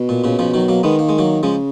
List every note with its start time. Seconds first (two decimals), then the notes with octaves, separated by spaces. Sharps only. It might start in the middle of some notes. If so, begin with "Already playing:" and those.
Already playing: B2
0.09 A#2
0.24 A#2 C#3
0.39 C#3 F3
0.54 D#3 F#3
0.68 F#3 A#3
0.83 D#3 G#3 B3
0.99 A#3
1.09 G#3
1.19 F#3 A#3
1.43 C#3 F3 G#3